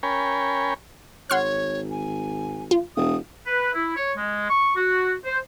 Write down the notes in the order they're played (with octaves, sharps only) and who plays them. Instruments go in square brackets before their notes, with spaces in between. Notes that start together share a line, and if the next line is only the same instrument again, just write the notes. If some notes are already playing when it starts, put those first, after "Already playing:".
[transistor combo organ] C#4 A#4 C#5 G5 G#5 B5
[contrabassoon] G#1 [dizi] C#5 [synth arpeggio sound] F#5 C6 F6
[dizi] G#5
[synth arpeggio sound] F4
[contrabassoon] E1 [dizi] D#6
[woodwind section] B4
E4
C#5
G#3
C#6
F#4
C5